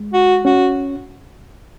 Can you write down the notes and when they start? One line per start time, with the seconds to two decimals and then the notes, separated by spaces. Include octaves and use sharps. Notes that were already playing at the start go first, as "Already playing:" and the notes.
Already playing: G#3
0.13 F#4
0.45 C#4 F#4